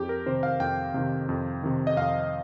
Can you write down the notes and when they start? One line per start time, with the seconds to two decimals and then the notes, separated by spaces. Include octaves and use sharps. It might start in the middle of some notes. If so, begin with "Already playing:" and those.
Already playing: F2 G4
0.09 A#4
0.26 C3 D#3 C5
0.43 F5
0.60 F2 G5
0.94 C3 D#3
1.29 F2
1.63 C3 D#3
1.87 D#5
1.97 F2 F5